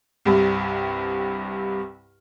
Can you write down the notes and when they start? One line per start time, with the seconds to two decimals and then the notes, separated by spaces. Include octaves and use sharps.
0.25 C2 G2 C3